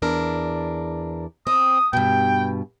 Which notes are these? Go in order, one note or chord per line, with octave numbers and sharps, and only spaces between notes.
E2 D4 A#4
C4 D#6
G2 B2 G5